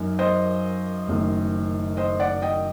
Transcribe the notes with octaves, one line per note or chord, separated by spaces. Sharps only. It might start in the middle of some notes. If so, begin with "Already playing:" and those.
Already playing: F#2 F#3 A#3 D#4
C5 D#5
F#1 F#2 D#3 A3
C5 D#5
D5 F#5
D#5 G5